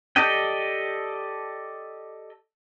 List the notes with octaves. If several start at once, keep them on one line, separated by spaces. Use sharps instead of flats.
G4 A4 D5 D#5 G5